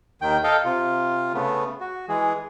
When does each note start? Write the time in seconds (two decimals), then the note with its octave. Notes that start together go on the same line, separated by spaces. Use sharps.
0.22 D#2 D#3 G5
0.44 A4 D#5 F5 G5
0.65 C3 F4
1.34 C#3 A3 B3
1.81 F#4
2.08 E3 G#3 G#4